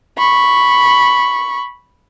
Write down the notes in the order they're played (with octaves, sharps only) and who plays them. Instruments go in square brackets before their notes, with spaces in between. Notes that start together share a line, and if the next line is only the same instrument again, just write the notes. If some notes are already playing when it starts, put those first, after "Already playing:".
[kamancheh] B5 C#6